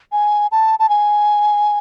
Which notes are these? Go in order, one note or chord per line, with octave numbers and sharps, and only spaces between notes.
G#5
A5
A5
G#5